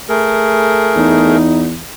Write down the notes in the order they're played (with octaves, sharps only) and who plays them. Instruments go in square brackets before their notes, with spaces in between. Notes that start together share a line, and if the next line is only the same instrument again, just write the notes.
[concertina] A3 G#4 A#4
[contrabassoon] E2 [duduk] D#4